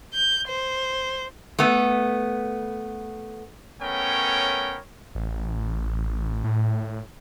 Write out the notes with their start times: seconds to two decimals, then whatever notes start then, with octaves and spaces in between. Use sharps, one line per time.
0.14 G6
0.48 C5
1.59 A3 B3
3.81 A3 B3 C#4 A#4 C#5 G5
5.15 A1
6.44 A2